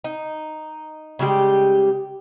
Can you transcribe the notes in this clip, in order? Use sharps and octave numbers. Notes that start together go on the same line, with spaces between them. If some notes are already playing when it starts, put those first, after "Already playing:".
D#4
C#3 G3 G#3 G4